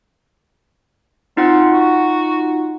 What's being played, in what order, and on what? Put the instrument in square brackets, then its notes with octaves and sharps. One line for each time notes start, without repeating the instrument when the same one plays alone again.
[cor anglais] C4 [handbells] D#4 F4 F#5
[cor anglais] F#4